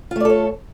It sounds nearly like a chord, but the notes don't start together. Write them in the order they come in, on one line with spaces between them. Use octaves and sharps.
F4 A3 D5 A4 C#5